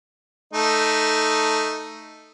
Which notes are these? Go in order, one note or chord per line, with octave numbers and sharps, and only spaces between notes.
A3 D#4